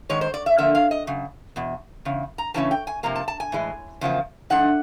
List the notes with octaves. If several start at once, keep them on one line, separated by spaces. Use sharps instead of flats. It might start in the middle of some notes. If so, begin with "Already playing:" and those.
G#2 D#3 G#3 C#5
C5
D5
E5
D3 F3 A#3 E5
F5
D#5
F#2 C#3
E2 B2
E2 C#3
A#5
C#3 E3 A3 C#4 A5
G5
G#5
C3 F3 A#3 A#5
A5
A5
G#5
A2 E3 G#3
E2 C#3 F3 A#3
G#2 F3 A3 D4 F#5